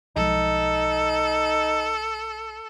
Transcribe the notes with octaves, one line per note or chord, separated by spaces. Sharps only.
B1 F3 G#3 D#4 A4